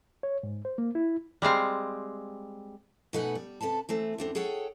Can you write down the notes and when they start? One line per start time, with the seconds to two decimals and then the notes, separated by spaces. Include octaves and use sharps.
0.23 C#5
0.43 G#2
0.65 C5
0.78 A#3
0.95 E4
1.42 G3 G#3 C4 F5
3.13 B2 A3 D#4 B4 F#5 G#5
3.35 G3
3.61 C3 A4 B4 A5
3.89 E3 A3 C4
4.18 E2 D3 C4
4.35 G#4 A4 C#5 F#5 G5